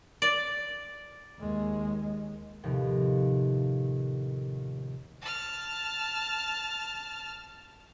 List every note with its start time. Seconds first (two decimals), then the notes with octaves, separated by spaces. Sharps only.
0.22 D5
1.38 D#2 G#3
2.63 D#2 A2 C3 F3
5.22 A5 F6